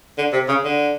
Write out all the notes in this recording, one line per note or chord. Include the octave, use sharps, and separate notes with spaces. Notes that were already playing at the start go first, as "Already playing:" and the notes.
D3
C3
C#3
D3